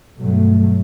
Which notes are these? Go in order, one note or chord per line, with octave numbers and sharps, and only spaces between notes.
G2 B2 F#3 A3